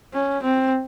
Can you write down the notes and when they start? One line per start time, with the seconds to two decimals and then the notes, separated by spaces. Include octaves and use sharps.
0.14 C#4
0.43 C4